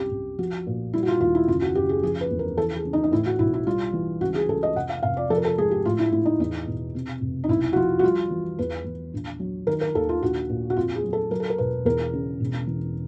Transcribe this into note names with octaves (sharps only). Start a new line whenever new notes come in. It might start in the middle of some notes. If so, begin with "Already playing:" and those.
Already playing: C2 F#2 G4
C2
F3 F#4
A#2
G3 E4
F#4
F4
D#2 F4
E4
F#1 F4
F#4
F#1 G4
G#4
F3 G#4
B4
E2
A#4
E3 A4
G#4
C#3
D#4
D#4
A2 E4
F#4
B1 E4
E4
G3 F4
E3
C#2 F#4
G#4
C#2 A4
D#5
F1 F#5
F5
F1 F5
D5
F3 A4
A#4
A4
G#2 G#4
G4
A2 F4
E4
A2 E4
D#4
E2 D#4
B2
C3
F1
D#4
B1 E4
F#4
F3 F4
F#4
G3 F4
E3
E2 B4
E2
A#1
F#3
D#3 A#4
A#4
D#2 A4
F4
A#1 F#4
A#2
F#4
F2 F4
G#4
F#3
A4
F#3 A#4
A4
A#4
E1 B4
E2 A#4
C#3
E1
E3